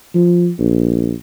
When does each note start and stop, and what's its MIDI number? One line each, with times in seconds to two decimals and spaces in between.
0.15 0.51 53
0.59 1.13 34